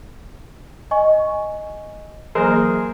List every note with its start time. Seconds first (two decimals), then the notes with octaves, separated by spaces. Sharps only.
0.91 D#5 G#5 C#6
2.35 E3 F#3 A#3 G#4 A#4 C5